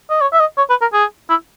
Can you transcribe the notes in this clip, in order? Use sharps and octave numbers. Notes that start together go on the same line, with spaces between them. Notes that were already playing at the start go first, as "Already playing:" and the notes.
D#5
C#5
E5
D#5
C#5
B4
A#4
G#4
E4